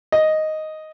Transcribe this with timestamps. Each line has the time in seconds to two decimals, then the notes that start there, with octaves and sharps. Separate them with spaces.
0.12 D#5